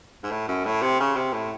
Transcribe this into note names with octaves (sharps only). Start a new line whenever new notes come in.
G#2
A2
F#2
A2
C3
C#3
C3
A2